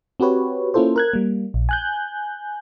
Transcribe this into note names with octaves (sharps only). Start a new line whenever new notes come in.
C4 F#4 G4 B4 C#5
A#3 C#4 E4 F4 A4 C5
A#4 F#6 G#6
G3 A#3
A#1
G#5 F#6 G6